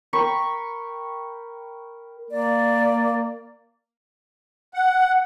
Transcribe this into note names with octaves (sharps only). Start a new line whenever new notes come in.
A#4 G5 B5 C#6
A#3 D5
F#5